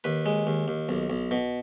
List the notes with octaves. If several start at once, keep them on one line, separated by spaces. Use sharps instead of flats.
D#2 B4
G#3
D#2
D#2
B1
B1
B2